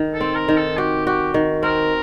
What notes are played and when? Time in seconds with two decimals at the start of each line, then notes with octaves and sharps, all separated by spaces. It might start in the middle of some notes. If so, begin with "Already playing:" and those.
Already playing: D#3
0.14 A4
0.21 C4
0.35 A#4
0.48 D#3
0.56 A4
0.77 F#4 G4
1.07 F#4 G4
1.34 D#3
1.63 C4 A#4